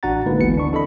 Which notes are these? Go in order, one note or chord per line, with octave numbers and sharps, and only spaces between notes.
A1 D4 F#4 F#5 A#5 A6
D3 G#3 A#3 D#4 F4 B4
G1 D2 E3 B3 C#7
D3 D4 C#6
C4 D4 A4 D#5 B5